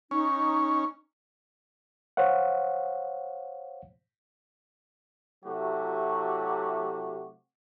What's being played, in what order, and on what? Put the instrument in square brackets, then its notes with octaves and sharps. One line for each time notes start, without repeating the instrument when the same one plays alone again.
[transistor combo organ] C#4 [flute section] D#4
[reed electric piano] C5 C#5 F5 F#5
[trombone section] C3 F#3 A3 E4 F#4 G4